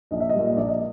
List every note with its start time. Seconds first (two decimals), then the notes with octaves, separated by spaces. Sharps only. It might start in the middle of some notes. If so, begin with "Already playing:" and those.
0.11 A#1 D#5
0.20 E5
0.29 D#5
0.35 A#2 G3
0.57 A#1 D5
0.68 D#5